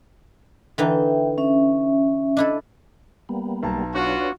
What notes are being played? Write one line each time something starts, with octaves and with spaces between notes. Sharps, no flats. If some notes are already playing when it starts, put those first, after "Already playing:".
D3 E3 D#4 E5 G5
C#4 E5
D4 E4 A4 D#5
G3 A#3 B3
B1 A5 A#5
D4 F4 F#4 B4 C#5